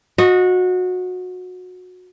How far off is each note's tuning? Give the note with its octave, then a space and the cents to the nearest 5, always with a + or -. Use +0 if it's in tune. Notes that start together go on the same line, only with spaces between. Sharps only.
F#4 -20 D#5 +0